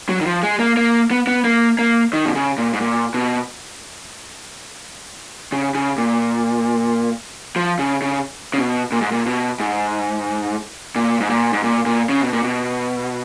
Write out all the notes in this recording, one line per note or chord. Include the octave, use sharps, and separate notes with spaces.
F#3
D#3
F3
G#3
A#3
A#3
B3
B3
A#3
A#3
D#3
B2
C#3
A#2
G#2
A#2
B2
C#3
C#3
A#2
F3
C#3
C#3
C#3
B2
A#2
G#2
A#2
B2
G#2
A#2
G#2
A#2
G#2
A#2
A#2
C#3
B2
A#2
B2